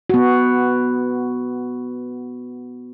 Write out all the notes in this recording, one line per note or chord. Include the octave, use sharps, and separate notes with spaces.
B3 F#4